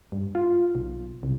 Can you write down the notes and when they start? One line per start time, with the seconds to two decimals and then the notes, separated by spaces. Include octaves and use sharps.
0.12 G2
0.35 F4
0.75 B1
1.23 C2